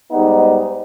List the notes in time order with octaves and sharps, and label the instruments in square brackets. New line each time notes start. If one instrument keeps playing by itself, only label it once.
[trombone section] G#2 G3 B3 D#4